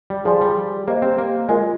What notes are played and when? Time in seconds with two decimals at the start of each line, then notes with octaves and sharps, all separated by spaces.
0.10 G3
0.25 F3 G#4 D5 G#5 C6
0.41 G3
0.88 A#3 G4 C5 D#5
1.02 C4
1.18 A#3
1.49 G#3 F4 A#4 D#5 G#5